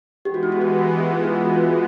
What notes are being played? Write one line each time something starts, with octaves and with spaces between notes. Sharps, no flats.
E3 G#3 B3 G4
F#4
E4
F#4
G4
G4
F4
E4
F4
F#4
F4